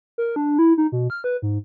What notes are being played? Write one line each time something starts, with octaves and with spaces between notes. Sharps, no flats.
A#4
D4
E4
D#4
B2
F6
B4
G#2